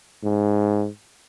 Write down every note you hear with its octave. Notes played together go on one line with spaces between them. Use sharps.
G#2